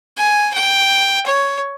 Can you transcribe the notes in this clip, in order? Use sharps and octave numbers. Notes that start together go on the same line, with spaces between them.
G#5
G5
C#5